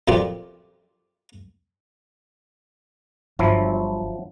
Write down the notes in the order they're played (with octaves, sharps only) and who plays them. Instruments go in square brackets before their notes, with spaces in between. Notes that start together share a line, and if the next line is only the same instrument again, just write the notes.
[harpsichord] F2 A#2 F4 G4 D5
[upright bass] G1 [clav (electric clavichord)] F3 F#3 E4